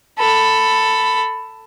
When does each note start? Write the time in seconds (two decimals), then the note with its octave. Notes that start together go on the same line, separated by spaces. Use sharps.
0.19 A4 B5